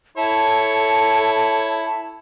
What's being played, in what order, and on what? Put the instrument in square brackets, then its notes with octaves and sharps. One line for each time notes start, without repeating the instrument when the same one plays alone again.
[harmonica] E4 C#5 [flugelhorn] A4 [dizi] A5